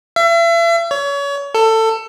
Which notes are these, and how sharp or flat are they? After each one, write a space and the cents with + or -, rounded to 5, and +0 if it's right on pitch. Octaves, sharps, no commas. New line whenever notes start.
E5 +40
C#5 +30
A4 +20